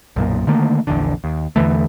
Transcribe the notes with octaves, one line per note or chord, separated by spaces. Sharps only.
B1 F#2 A#2
D3 D#3 A3 A#3
A#1 E2 D3
D#2
E2 D3 E3 A3